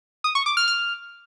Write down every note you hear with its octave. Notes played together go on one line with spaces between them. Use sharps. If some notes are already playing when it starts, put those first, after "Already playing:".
D#6
C#6
D6
F6
F6